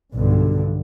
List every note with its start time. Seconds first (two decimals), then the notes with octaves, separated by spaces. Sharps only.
0.14 B1 G2 D3